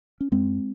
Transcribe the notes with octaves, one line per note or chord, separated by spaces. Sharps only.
C#4
F#2 G#3 C4